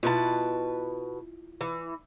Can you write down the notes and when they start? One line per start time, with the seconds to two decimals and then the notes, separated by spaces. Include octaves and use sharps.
0.03 B2 E4 F4 B4 A5
1.61 E3